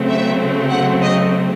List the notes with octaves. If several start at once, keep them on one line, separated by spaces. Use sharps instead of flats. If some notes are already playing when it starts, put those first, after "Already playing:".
Already playing: C#3 F#3 A3 C4
E5
F#5
D#5